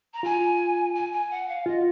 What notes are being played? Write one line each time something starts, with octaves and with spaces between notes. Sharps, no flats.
A#5
F4 G#5
G#5
G#5
F#5
F5
F4 D#5